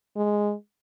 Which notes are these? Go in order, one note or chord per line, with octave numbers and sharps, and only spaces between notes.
G#3